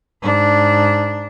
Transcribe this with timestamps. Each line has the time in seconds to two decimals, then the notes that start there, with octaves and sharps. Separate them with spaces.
0.22 G#2 D4